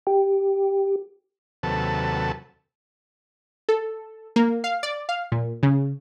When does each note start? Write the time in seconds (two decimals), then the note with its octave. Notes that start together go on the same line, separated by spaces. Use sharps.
0.07 G4
1.63 D#2 C3 F#3 A4 B4 A5
3.69 A4
4.36 A#3
4.64 F5
4.83 D5
5.09 F5
5.32 A#2
5.63 C#3